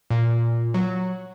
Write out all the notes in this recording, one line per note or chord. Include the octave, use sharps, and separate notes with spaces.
A#2
F#3